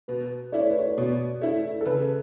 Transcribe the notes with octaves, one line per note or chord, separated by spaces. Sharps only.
B2 B4
A3 E4 D5
C#5
B4
C#5
B2 C#5
A3 E4
A4
C#3 B4